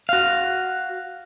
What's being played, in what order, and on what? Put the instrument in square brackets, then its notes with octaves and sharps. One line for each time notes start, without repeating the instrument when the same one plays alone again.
[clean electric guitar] F#4 F5